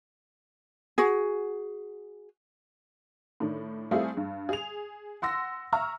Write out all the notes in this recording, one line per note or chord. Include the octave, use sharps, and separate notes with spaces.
F#4 G#4
A2 D#3 D4
G3 A3 C4 E4 F4 G#4
G2
G#4 F7
F#5 C6 E6 A#6
E5 A#5 C#6 E6 F6